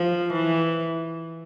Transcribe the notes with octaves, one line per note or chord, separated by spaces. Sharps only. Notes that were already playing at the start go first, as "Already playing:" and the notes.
Already playing: F3
E3